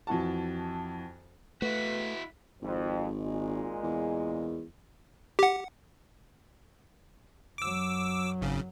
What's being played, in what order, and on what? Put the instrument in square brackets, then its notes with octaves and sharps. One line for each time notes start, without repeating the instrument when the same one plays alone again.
[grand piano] F2 E3 F#4 A5
[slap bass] A3 [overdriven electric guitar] E4 F#4 [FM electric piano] B4 [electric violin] B6
[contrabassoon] G#1 [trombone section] F2
[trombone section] A#2 G#3
[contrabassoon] E2
[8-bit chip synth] G4 F#5
[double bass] F#2 F#3 [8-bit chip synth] D6 E6
[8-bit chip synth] G#1 C#3